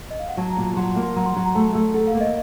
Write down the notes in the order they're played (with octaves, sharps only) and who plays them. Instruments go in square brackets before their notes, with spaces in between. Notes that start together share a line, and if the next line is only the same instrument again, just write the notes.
[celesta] D#5
F5
F#5
[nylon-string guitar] F#3 [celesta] A5
[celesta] A#5
[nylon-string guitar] A#2
[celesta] A#5
[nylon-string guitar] F#3 [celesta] C6
[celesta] C6
[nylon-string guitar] A#3
[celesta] C6
[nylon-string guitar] F#3 [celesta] A#5
[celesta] C6
[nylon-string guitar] F#3 [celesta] A#5
[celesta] A#5
[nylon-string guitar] A3 [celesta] A5
[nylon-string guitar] A3
[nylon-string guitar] A4 [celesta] F#5
[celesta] F5
[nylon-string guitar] A#3
[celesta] D#5